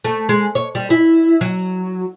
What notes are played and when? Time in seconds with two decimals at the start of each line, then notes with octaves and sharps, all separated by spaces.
0.05 A3
0.29 G#3
0.55 C#5
0.75 G3
0.90 E4
1.41 F#3